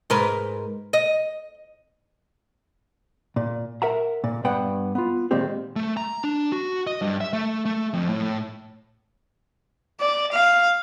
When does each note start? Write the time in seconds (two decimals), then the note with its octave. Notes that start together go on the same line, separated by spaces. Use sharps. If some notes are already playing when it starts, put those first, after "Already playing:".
0.10 G#2 A#4 B4
0.93 D#5
3.36 A#2
3.82 A#4 E5 F#5 A#5
4.24 A#2
4.45 G2 B3 F#5 G5 B5
4.95 B3 F4
5.31 A#2 D#3 G#3 A#3 C4 G4
5.76 A3
5.97 A#5
6.24 D4
6.52 F#4
6.87 D#5
7.02 G2
7.21 E5
7.33 A3
7.65 A3
7.94 F2
8.09 A2
10.00 D5
10.32 F5